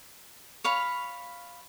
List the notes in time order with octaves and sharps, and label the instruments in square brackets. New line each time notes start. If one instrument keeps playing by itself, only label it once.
[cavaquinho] C#5 F5 B5